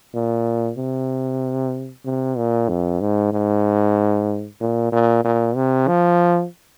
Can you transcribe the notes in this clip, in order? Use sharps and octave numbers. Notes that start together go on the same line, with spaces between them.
A#2
C3
C3
A#2
F2
G#2
G#2
A#2
A#2
A#2
C3
F3